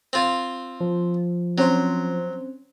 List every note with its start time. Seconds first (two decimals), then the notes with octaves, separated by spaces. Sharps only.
0.13 C4 F4
0.81 F3
1.58 F#3 C4 C#4 C5